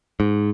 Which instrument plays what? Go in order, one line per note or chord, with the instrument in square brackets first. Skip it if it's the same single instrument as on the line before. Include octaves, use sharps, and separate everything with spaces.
[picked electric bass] G#2